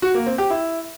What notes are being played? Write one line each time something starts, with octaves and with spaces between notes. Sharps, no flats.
F#4
A#3
C4
G4
E4